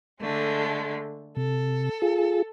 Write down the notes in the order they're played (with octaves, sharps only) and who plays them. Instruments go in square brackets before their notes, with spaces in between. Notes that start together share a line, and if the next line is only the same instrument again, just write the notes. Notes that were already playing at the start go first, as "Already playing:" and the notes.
[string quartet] D3 G#3 A3
[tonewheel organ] C3 [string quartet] A4
[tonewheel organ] F4 G#4